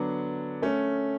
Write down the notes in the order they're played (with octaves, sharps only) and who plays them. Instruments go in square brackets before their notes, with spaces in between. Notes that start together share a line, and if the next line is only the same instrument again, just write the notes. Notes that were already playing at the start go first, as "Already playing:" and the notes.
Already playing: [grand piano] D3 F#3 B3 D4
A3 C#4